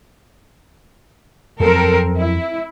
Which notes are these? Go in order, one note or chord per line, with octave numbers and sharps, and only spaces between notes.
F2 F3 F#3 C4 A4 A#4
E4